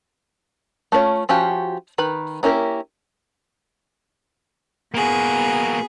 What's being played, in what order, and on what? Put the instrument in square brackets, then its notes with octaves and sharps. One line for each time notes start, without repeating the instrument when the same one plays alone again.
[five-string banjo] A3 C#4 F4 B4 C#5
F3 C#4 F#4 G4 F5
D#3 B4 B5
A#3 C#4 E4 G4 A#4
[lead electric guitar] A#3 F#4 [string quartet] B3 G#4